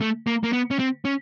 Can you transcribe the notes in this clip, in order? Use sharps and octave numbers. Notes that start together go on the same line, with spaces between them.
A3
A#3
A#3
B3
C#4
C4
C#4